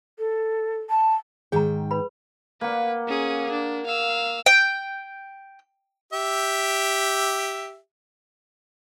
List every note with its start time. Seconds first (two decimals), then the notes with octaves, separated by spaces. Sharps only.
0.19 A4
0.90 A5
1.52 G#2 D#3 G#4 G5 A#5
1.91 B4 B5
2.61 A#3 B4 F#5
3.07 C#4 G#4
3.51 D4
3.86 F5 E6
4.46 G5
6.13 G4 E5